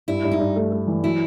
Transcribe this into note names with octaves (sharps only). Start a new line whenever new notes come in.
G2 E4
G2
D#4
G2
A3
A3
E3
F#3 E4